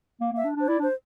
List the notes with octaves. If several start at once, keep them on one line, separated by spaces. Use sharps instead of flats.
A#3
A#3
E5
D4
D4
C5
E4 D5
D4
C5